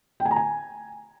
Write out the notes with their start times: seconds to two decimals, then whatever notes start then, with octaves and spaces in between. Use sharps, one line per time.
0.20 G5
0.25 G#5
0.31 A#5
0.36 G#5